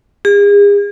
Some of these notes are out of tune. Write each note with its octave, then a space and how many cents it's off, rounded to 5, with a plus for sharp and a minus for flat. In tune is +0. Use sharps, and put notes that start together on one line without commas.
G#4 -40